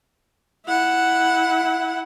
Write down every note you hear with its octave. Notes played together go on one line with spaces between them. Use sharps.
E4 F#5